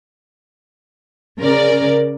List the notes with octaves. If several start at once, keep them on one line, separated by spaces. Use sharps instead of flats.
C#3 A#4 D5